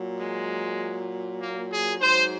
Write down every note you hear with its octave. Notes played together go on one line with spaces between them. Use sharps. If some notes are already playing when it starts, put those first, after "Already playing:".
Already playing: A#2 F#3
G#3
A#3
G#4
G#2 F#3 C5